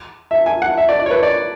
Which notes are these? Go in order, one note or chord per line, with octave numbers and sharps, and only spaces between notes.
E5
G#5
F#5
E5
D5
D5
C#5
B4
D5